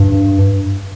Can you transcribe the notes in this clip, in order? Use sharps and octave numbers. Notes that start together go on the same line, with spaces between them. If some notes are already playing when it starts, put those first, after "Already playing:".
Already playing: G2